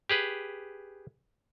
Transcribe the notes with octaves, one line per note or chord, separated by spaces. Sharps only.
G4 G#4 B4